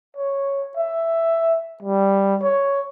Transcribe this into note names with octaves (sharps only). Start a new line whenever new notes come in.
C#5
E5
G3
C#5